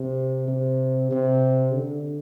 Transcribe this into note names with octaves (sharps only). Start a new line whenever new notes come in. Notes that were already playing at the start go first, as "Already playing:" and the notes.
Already playing: C3
C3
C3
D3